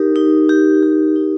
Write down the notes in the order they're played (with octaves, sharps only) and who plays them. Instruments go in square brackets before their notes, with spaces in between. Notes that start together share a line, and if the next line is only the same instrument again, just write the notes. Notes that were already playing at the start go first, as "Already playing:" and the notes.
Already playing: [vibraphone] D#4 G4 A#4
D#4
G4
G4
D#4